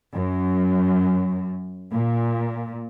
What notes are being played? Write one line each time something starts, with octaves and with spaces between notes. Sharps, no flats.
F#2
A#2